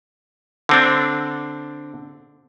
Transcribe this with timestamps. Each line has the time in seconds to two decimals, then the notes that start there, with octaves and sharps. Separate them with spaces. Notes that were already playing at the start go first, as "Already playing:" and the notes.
0.69 D3 C4 D4